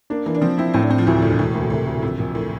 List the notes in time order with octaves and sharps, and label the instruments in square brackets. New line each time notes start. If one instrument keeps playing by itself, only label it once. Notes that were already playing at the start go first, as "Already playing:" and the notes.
[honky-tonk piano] A#3 [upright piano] D4
[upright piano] E3 [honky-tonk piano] A#3
[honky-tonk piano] D4
[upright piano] F3 [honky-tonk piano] C4
[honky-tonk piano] C4 [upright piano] E4
[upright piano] A2 [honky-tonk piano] C4
[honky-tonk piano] D4
[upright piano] A2 [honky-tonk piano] C4
[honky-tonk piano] F3
[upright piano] D2 [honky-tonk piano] E3
[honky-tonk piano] C3
[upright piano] E1 [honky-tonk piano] A2
[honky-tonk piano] G2
[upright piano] E1 [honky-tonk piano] A2
[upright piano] D2 [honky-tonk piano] A#2
[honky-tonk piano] A2 [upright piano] C3
[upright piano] D2 [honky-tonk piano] A#2
[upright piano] A#1 [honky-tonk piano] C3
[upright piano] A#1 [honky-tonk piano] A#2
[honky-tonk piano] A2